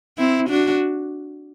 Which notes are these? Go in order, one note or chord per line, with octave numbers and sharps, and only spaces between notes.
C4 E4
D4 F#4